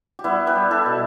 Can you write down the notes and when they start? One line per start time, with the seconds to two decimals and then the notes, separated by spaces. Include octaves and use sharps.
0.19 G4
0.24 G3 B3 E4
0.47 G4 B4
0.55 G3
0.71 E4 A4
0.86 B2